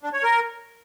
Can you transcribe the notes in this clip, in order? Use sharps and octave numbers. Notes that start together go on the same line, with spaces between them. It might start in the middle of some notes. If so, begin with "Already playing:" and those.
D4
C#5
A#4